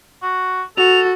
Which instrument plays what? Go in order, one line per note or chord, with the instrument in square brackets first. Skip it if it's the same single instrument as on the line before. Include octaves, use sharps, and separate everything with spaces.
[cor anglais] F#4
[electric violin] F#4 [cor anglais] A4 [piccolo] F7